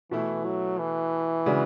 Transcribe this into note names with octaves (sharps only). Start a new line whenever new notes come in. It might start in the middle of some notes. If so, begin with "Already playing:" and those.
B2 E3 A3 E4
F#3
E3
C#3 G#3 D4 F#4